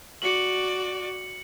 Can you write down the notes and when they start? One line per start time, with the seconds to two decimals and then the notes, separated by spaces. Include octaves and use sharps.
0.22 F#4 D5 C#7 F#7